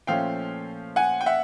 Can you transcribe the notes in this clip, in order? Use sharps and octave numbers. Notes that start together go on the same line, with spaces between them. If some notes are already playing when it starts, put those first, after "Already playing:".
A#2 F3 A3 C#4 F5 G5
F#5 G#5
G5
E5 F#5